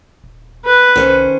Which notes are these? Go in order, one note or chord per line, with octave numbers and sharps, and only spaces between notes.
D#1
B4
C2 D#3 C#4 C5